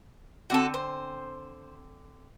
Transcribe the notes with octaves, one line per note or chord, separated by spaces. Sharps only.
D3 C4 F#4 A4 G#5
C5